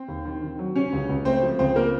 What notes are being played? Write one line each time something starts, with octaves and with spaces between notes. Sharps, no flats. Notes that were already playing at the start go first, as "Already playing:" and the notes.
Already playing: C4 C5
D#2
D#3
D#3
F#3
C3 C#4 C#5
C#2
C#2
A3 C4 C5
F3
C#2 C4 C5
A#3 A#4